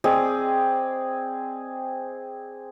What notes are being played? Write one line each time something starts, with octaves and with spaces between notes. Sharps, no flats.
C4 G#4 D5 D#5